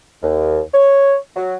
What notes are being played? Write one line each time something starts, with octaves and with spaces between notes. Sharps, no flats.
D#2
C#5
F#3